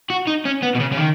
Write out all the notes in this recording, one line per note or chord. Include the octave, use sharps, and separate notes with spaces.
F#4
D#4
C#4
B3
B2
C#3
C#3
D#3